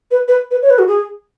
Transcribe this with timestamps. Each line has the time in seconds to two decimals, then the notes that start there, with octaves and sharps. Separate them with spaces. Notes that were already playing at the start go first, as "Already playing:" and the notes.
0.11 B4
0.28 B4
0.51 B4
0.62 C#5
0.70 B4
0.79 F#4
0.88 G#4